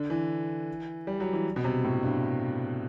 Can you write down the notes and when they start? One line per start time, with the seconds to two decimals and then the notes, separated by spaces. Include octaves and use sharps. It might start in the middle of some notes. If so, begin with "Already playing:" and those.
Already playing: D3
0.10 E3
1.07 G3
1.20 F#3
1.33 E3
1.56 B2
1.64 C3
1.84 A2
2.03 G2